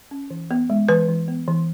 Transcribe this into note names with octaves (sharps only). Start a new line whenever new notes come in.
C#4
E3
B3
G#3
E3 B4
E3
B3
E3